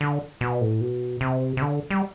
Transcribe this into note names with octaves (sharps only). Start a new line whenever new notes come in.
D3
B2
A2
B2
C3
C3
D3
G3